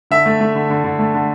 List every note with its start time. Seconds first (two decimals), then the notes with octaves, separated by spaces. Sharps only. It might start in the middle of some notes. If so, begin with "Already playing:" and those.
0.11 D3 E5
0.26 A3
0.41 A3
0.55 D3
0.70 D3
0.84 D3
0.99 A3
1.14 D3